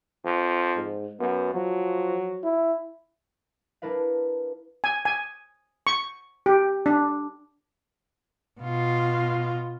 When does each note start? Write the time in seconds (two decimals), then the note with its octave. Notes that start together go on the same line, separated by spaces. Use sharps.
0.25 F2
0.77 G#2
1.20 F#2 B3
1.54 F3 F#3
2.43 E4
3.82 D4 E4 A#4 B4 F5
4.84 G#5
5.05 G#5
5.87 C#6
6.46 G4
6.86 D4
8.61 B2 F4